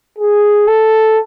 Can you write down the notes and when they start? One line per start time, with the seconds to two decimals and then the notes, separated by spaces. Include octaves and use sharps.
0.19 G#4
0.68 A4